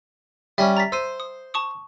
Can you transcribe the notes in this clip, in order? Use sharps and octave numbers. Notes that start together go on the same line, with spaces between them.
G3 C#4 E5
A#5 A6 B6
C5 E6 D#7
D#6
A5 C#6 D#6